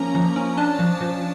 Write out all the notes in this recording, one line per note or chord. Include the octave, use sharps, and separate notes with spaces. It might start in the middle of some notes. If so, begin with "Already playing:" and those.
Already playing: F3 A#3 C#4 A#5
F3
C#4
D4 A5
F3
F3